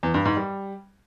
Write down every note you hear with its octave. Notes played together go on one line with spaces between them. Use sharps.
E2
G2
G#2
G3